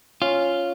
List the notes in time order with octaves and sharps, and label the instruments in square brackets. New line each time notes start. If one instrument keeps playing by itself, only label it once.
[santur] C#4 [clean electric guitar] F4